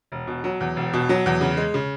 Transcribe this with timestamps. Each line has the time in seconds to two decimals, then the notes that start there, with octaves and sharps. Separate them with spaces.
0.12 E1
0.27 B2
0.44 F#3
0.61 E2
0.76 E1
0.93 B2
1.09 F#3
1.26 E2
1.41 C#3
1.57 G#3
1.74 C#3